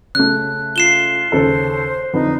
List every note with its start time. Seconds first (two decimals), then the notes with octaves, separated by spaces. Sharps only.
0.15 C#3 A3 F#6
0.76 F4 C7 E7 G7
1.32 D#2 C#3 A4 C5
2.13 F2 D3 D#4 B4